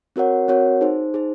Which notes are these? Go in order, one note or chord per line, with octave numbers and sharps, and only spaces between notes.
C4 F#4 A#4 C#5 F#5
C4 F#4 A#4 C#5 F#5
D#4 G#4 C5
D#4 G#4 C5